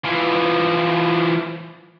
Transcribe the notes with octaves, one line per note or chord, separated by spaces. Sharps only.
E3 F3